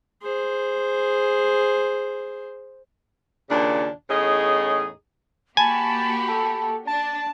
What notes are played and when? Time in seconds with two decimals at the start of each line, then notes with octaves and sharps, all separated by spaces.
0.22 G#4 C5
3.49 D#2 A#2 C#3 D4
4.10 E2 A2 C#4 D#4 G#4 D#5
5.57 A#3 F#4 G4 G#5 A5 B5
6.28 A4
6.87 D4 A5